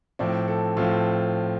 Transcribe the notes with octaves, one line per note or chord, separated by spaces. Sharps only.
A2 F3 C4 D5
A4
A2 F3 C4 F4